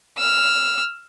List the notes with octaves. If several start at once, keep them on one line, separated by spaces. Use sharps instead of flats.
E6 F6